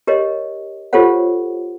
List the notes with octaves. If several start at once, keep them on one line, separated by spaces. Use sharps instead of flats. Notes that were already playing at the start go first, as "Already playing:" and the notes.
G4 A#4 C#5 D#5
F4 G4 A4 C5 C#5 F#5